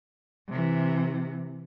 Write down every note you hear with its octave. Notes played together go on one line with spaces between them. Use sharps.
C3 E3